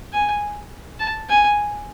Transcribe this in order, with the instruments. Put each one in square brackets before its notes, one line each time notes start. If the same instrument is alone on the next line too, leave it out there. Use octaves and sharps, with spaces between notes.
[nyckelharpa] G#5
A5
G#5